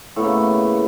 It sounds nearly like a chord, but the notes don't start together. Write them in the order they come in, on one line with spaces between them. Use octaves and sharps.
A2 B3 A#3 C#3